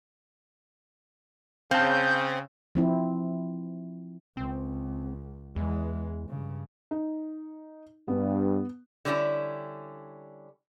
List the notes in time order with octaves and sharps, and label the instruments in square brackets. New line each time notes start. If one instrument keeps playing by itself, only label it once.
[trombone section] C#3 [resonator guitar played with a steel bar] C4 [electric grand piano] F5 A5 [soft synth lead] G6
[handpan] F3 C4 E4
[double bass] C#2 [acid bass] C4
[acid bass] E2 [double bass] E3 G#3
[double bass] G2 C#3
[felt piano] D#4
[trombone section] G2 [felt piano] B3
[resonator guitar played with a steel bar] D3 G3 C#4 D4 E4